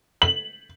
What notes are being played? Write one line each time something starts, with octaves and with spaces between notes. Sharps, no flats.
F#7